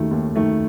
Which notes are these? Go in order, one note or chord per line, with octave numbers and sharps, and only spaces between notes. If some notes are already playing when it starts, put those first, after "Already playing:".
Already playing: D#2 D#3 A3
D#2
D#3 A3